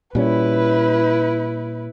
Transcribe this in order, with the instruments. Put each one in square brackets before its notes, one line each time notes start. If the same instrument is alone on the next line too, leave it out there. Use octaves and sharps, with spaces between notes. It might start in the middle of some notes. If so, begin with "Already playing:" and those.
[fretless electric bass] A#2 G3 C#4 [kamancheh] E4 B4